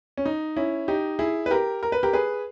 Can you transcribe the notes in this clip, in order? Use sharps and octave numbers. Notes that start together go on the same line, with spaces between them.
C#4
D#4
C#4 E4
D#4 G4
E4 G#4
B4
G4 A#4
A#4
B4
G4 A#4
G#4 B4